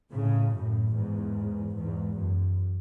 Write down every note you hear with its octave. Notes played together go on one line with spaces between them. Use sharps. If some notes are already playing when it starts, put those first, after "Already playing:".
A2 C#3
F#2 A2
E2 G#2
E2 G#2
F#2